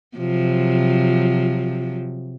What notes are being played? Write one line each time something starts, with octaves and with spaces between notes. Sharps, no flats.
C3 F3 F#3